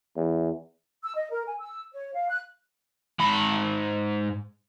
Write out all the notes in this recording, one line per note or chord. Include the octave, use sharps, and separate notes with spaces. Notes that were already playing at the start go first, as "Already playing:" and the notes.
E2
E6
D#5
A#4
G#5
E6
C#5
F5
F#6
G#2 B5